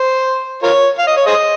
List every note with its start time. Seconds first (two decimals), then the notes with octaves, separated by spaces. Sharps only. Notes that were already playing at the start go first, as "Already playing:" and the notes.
Already playing: C5
0.63 F4 A#4 C#5
0.99 F5
1.08 D#5
1.17 C#5
1.26 G#4 C5 D#5